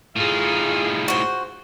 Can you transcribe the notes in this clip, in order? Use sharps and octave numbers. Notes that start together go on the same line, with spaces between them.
A2 D#4 F4 G#4
F#4 C5